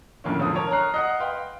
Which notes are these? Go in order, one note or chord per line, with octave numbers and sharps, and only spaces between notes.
F2 A2 D3 A#3 C#4
E1 D3 F3 D#6
A#4 C#5 A5
A#5 F6 F#6 C7
D#5 F#5
B4 F5 G5 C6